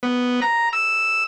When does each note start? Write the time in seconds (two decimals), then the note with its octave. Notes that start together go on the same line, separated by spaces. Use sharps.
0.03 B3
0.42 A#5
0.73 E6